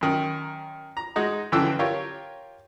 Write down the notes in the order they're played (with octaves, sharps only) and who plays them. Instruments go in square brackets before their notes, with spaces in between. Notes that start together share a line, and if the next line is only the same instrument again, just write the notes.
[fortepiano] F#2 D#3
A#5
G#3 D#4 F#4
F#2 D3 E3 F3 G5 E6
F4 G4 A#4 C#5